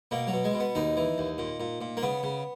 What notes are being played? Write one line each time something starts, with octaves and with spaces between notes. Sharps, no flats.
B2 A#3
F#3
B2
G#3
B2
B3
D#2 D#4
E3
D#2
A#2
A#2
A#2
A#3
C#3 B3
C#3